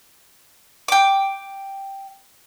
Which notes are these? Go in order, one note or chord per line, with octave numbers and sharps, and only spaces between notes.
G5 D6